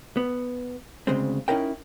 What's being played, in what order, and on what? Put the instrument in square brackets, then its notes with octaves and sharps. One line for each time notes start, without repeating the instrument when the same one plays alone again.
[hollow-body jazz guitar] B3
D2 C#3 G#3 C4
C#4 D#4 E4 A#4 G5